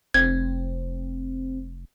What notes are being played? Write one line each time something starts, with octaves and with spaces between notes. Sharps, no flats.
F1 C4 G#6